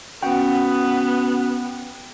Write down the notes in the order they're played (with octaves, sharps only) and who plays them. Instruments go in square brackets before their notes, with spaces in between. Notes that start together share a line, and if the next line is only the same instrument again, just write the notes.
[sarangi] B3 [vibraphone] C#4 F#4 [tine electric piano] F#5 G5